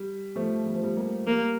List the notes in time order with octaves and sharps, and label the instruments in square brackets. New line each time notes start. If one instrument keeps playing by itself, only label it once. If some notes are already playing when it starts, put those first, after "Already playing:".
Already playing: [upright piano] G3
F3 A3
G3
F3
G3
G3 A#3
[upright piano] G3 [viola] A#3